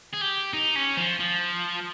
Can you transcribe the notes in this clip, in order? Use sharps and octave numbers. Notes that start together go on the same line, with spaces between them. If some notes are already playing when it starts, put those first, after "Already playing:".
G#4
G4
D#4
C#4
F3
F3